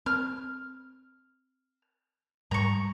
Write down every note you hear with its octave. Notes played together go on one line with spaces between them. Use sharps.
C4 F6
G#2 G3 A#5 C#6